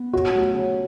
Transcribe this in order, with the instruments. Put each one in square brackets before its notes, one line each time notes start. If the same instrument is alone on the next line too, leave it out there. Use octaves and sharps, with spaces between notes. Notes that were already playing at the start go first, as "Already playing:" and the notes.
Already playing: [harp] B3
[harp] C#3 [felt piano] F#4
[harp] F#3 A3 E4 G4
C#3